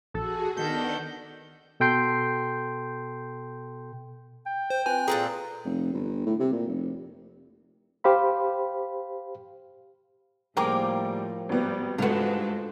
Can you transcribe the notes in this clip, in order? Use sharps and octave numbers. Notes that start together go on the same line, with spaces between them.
A#1 F#4 G#4 A4
D#3 B3 D4 A4 F#5 G6
B2 A4 G5 C6 G6 C7
G5
C5
C4 F4 B4 G#5
A#2 F4 G#4 A4 B4 A#5
F1
G1
A2
C3
A#2
F1
G4 C5 F5 B5
A2 F3 G3 A#3 G#4 G5 A#5 D6
G#1 G3 B3
A1 G#2 G#3 A3 F4 F#4 A4 B4
G2